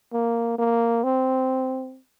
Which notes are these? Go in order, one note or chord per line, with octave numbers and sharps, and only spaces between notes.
A#3
A#3
C4